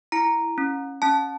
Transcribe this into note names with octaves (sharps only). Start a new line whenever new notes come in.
E4 A#5
C#4
C#4 A5